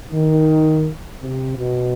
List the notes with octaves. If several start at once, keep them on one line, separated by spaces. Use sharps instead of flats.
D#3
C3
B2